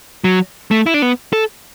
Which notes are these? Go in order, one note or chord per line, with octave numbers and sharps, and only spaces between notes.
F#3
A3
E4
D4
B3
A4